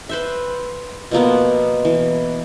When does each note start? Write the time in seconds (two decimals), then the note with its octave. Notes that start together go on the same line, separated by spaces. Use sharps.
0.09 B4 C5 E5
1.11 B2 F3 A#3 B3
1.85 E3